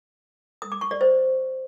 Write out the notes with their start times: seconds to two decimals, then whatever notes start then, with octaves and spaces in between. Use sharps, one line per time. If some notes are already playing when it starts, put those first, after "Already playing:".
0.62 D#6
0.72 D6
0.81 C#6
0.91 D5
1.01 C5